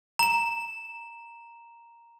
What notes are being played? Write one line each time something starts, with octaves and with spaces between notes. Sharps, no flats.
A#5 E7